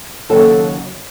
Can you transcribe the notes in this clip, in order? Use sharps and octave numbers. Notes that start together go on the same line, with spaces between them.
D#2 C#3 F#3 A4